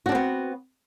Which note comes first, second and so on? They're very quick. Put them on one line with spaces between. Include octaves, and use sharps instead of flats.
F#4 D4 C4 B3